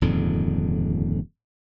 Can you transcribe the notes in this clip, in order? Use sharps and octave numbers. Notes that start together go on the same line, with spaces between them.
D#1 F2 G#2 D3